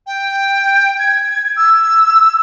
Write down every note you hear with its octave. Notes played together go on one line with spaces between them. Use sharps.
G5
G#6
E6